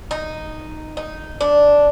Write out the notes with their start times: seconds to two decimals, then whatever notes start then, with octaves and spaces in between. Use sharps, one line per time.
0.11 D#4
0.97 D#4
1.41 D4